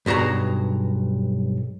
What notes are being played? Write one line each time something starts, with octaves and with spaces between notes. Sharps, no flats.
B1 G2 F#4 G#4 A#5